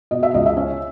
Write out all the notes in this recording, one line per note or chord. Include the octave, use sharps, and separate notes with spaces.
B2 D#5
E5
C#2 D#5
E5
C#4